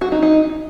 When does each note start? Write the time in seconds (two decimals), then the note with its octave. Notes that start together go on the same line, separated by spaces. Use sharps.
0.01 F#4
0.12 D#4
0.22 D#4